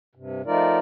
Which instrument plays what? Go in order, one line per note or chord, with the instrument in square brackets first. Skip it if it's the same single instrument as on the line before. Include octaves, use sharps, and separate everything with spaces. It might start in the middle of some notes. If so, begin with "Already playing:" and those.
[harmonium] G2 C3
F3 A3 D#4 F4 A#4 D5